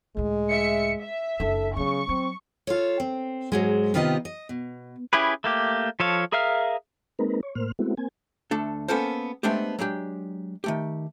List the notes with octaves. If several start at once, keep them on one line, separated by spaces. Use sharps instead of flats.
C#2 A2 G#3
E5 C#7
E5
F#1 D4 A4
C#3 F#3 B3 C#6
F#3 C4
F4 A4 C#5
C4
G#2 F#3 G#3
C3 D#3 B3 F4 G4 D#5
D#5
B2
C#4 E4 G4 G#4 B4
A3 A#3 G4
F3 A4 C#5 F5
G#4 A#4 E5 F5 F6
G#3 A#3 C4 D#4 A#4 B4
C#5
A2 A#3 C5 F6
G#3 A3 B3 C4 E4 F#4
A#3 C4 G#5
D2 A3 D4 A4
A#3 B3 C#4 A4 A#4 C5
G#3 A3 B3 C4 D4 G4
F#3 G#3 D4 G4
D#3 A3 G4